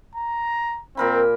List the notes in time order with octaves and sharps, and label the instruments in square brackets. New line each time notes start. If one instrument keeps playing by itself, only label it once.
[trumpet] A#5
[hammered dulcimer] A#2 A#4 B5 [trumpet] C4